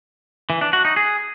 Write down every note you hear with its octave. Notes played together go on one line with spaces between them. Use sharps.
E3
D4
F#4
D#4
G#4